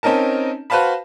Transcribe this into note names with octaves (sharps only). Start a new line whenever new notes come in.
C4 C#4 D#4 A#4 A5
F#4 B4 C5 F5 A5 B5